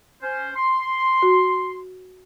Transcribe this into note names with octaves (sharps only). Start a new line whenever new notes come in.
C#4 C5
C6
F#4